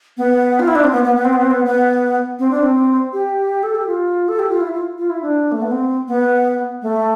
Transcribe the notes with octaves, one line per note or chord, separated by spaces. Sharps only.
B3
F4
E4
D4
C4
B3
B3
B3
C4
B3
C4
B3
B3
C4
D4
C4
G4
A4
G4
F4
A4
G4
F4
E4
F4
F4
E4
D4
A3
B3
C4
B3
A3